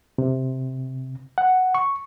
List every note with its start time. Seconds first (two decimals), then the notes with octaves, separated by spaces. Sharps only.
0.18 C3
1.38 F#5
1.75 C#6